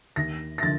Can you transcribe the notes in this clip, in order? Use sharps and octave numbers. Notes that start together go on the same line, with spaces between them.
D#2 A#6
A#6
D3 F3 A6